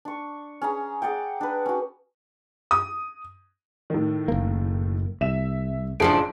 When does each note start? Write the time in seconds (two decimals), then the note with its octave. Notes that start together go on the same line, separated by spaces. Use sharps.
0.05 D4 C#6
0.62 C#4 G#4 A#5
1.02 G#4 D5 F#5 G5
1.41 D4 B4
1.66 C#4 F#4
2.71 D#6
3.90 A2 D#3
4.28 F#1 A#3
5.21 C2 E5 E7
6.00 F#1 A2 F3 D4 G#4 D7